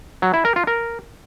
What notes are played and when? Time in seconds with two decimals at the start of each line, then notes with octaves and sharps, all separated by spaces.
0.22 F#3
0.34 E4
0.45 A#4
0.56 F4
0.67 A#4